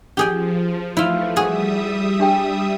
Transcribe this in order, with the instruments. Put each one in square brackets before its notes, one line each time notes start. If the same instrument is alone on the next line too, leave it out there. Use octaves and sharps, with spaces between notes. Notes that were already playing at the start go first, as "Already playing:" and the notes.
[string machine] F3 [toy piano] C#4 [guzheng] G4 G#4 G5
[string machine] E3 F3 A3 [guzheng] E4 F4
[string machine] G3 E5 D#6 [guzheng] F#4 G#4
[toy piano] D4 G4 G5